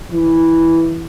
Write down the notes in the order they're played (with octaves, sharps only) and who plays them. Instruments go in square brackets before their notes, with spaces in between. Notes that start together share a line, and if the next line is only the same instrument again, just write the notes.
[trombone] E3